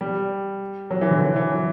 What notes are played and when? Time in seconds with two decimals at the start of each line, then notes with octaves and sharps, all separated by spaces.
0.01 G3
0.90 F#3
1.01 E3
1.11 D3
1.21 E3
1.36 E3
1.52 F#3